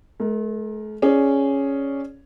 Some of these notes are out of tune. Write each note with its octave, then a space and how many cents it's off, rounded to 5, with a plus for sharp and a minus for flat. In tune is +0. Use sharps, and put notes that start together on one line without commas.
A3 -45 A#4 +0
C#4 +0 G#4 +0 D5 +0